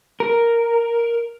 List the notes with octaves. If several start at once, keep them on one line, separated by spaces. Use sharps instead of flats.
A#4